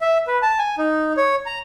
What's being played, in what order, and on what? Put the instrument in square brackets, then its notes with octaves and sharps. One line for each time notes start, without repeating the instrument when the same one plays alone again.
[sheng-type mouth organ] E5
B4
A5
G#5
D#4
C#5
A#5